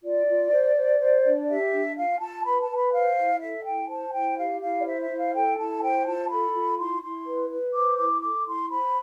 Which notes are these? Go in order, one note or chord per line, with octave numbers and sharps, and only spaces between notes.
F4 D5
F4
C5
C5
C5
D4
G4 E5
D4
F4 F5
F4 A5
B4 B5
A5
B4
B5
C5 F5
E4
A4 E5
E4 G5
C5 A5
E4 G5
G4 F5
E4 F5
D5
C5 E5
E5
E4
F5
A4 G5
E4 A5
C5 G5
F4 A5
A4 B5
F4
E4 C6
E4 C6
B4
B4
C5 D6
E4 D6
A4 D6
E4 C6
C5 B5